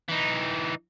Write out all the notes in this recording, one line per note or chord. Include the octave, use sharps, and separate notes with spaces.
E3 D#4